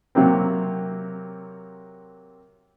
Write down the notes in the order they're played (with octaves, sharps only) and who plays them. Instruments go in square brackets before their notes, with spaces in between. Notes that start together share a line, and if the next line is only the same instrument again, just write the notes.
[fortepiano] C3 F#3 A#3 C4